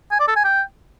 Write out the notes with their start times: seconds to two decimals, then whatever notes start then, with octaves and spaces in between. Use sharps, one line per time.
0.12 G#5
0.20 D5
0.28 A4
0.36 G#5
0.44 G5